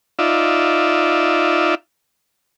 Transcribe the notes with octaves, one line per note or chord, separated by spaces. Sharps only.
D#4 F4 D5 E5